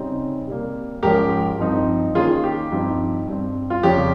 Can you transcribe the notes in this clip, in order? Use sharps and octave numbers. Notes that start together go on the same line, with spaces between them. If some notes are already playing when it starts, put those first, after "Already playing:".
Already playing: C#3 G3 C4 D#4
C3 G3 A#3
G#2 F3 G#3 C#4 G4 A#4
G2 F3 C4 D#4
D#3 A#3 C#4 F4 G#4
G4
G2 F3 C4 D#4
G2 G3 C4
F4
F2 C#3 G3 C#4 G4